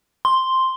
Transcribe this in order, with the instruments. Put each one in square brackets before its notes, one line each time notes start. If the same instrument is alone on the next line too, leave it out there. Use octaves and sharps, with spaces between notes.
[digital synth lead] C6